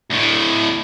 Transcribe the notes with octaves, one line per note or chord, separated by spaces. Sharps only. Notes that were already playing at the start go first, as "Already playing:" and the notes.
D2 A2